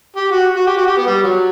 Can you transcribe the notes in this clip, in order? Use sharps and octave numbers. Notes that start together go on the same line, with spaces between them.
G4
F#4
F#4
G4
F#4
G4
B3
G3
F#3